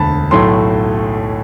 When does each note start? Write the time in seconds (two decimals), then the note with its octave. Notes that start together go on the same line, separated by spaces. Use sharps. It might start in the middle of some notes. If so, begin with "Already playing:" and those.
Already playing: E1 D2 D3 A5 B5
0.31 B1 A2 F#3 A3 C6